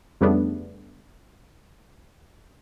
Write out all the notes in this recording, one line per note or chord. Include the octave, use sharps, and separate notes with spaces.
F2 C#3 G3 A3 B3 D4